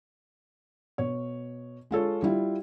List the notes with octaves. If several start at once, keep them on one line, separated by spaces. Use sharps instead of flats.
B2 C#5
G#3 F4 A4 C#5
G3 E4 F4